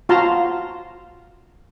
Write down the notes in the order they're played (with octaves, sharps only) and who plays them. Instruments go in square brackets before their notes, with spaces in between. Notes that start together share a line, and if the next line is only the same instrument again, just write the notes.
[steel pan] F4 F#4 F5 A5 A#5 C6